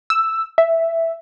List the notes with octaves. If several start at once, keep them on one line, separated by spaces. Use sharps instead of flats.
E6
E5